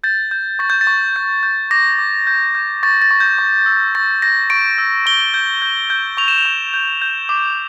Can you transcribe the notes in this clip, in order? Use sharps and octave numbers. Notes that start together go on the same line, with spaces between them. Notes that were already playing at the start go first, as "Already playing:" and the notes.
G6 A6
G6
C#6 A6
G6
A6
C#6
G6
G6
D6 A#6
D6
G6
G6
C#6 A6
A6
C#6
G6
C#6
E6
C#6 A6
G6 A#6
C#6 D7
E6
C#6 G7
G6
G6
G6
C#6 F7
E7
F7
C#6
G6
G6
D6